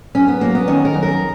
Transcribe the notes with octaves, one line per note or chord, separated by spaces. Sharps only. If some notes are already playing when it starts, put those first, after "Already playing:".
F#2 C#4
B3
F#3 A#3
B3
D#3 C#4
A#4
F#2
A#4